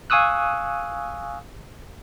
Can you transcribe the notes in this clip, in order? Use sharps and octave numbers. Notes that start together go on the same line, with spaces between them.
F5 G#5 C#6 D#6 E6 F#6